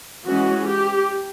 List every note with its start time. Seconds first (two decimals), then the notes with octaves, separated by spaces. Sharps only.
0.25 E3 G#3 C#4 F#4
0.66 G4